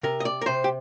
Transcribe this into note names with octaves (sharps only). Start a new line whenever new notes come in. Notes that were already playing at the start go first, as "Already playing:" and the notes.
C3 A#4
D#5
D5
A#4
C3 C5
G4